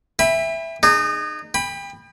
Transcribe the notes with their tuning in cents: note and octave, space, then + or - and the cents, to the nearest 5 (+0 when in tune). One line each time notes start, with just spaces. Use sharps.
E5 +5 G5 +45 B5 +0
D#4 -30 G#4 +0
G5 +35 B5 +0